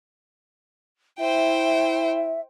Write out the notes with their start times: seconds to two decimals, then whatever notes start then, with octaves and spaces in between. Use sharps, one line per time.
1.20 E4 C5 E5 G5